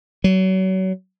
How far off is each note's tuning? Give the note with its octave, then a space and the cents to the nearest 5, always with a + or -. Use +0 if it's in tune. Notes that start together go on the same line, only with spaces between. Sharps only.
F#3 +30